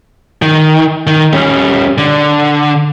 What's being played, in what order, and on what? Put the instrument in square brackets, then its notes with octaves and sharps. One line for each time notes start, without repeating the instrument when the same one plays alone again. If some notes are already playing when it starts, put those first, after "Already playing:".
[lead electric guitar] D#3
D#3
G3 C#4
D3